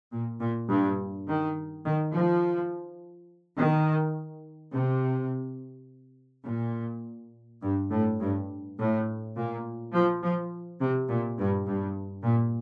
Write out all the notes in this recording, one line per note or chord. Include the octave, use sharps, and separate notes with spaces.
A#2
A#2
G2
D#3
D#3
F3
D#3
C3
A#2
G2
A2
G2
A2
A#2
F3
F3
C3
A#2
G2
G2
A#2